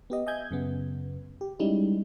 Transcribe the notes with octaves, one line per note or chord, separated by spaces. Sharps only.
B3 G4 D#5
D#5 E5 G#5 G6 G#6
F#2 C#3 B3
G4
G3 G#3 C#4 D#4 E4